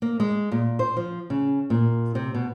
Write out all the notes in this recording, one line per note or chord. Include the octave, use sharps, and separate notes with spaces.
A#3
G#3
A#2
C5
F3
C#3
A#2
C3
B2